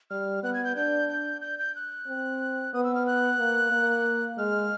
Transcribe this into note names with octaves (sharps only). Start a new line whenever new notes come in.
G3 F6
B3 F#6
G#6
G6
D4 G6
G6
G6
G6
F#6
C4
B3 D#6
E6
F6
F#6
A#3
A#3
G#3 F6